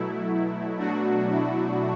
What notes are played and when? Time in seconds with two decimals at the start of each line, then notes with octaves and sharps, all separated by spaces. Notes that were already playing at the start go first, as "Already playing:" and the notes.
Already playing: B2 F#3 A3 E4
0.78 B2 F#3 A3 D4 F#4
1.29 E4